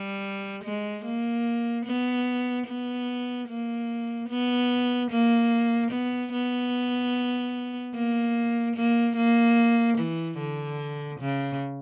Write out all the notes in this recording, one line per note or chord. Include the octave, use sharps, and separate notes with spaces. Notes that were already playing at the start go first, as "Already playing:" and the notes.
Already playing: G3
G#3
A#3
B3
B3
A#3
B3
A#3
B3
B3
A#3
A#3
A#3
E3
D3
C#3